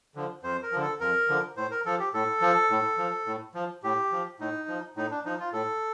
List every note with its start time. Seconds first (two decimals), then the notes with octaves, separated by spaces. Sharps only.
0.15 D3 F3
0.43 F2 C5
0.63 A#4
0.72 D3 F3
0.81 A4
1.00 F2 A#4
1.28 D3 F3
1.57 A2 C5
1.71 A#4
1.86 F3 A4
1.99 G4
2.14 A2 A4
2.41 F3
2.70 A2
2.98 F3
3.26 A2
3.55 F3
3.83 A2 G4
4.12 F3
4.40 A2 D#4
4.68 F3
4.97 A2 D#4
5.11 D4
5.25 F3 D#4
5.40 F4
5.53 A2 A4